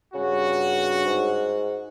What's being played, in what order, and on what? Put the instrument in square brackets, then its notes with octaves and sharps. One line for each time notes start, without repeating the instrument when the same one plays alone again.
[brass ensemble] G2 F#4 [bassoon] C#3
[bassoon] G#2